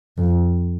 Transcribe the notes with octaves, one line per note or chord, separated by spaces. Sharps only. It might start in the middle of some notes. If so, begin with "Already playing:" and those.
F2